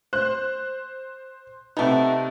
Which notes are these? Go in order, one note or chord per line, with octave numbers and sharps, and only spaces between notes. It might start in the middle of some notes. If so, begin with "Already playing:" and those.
C5 F#6
C3 A3 B3 D#4